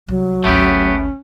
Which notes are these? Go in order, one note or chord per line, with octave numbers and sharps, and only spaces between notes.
C2 F#3
G#1 D2 A3 B3 C#4 G4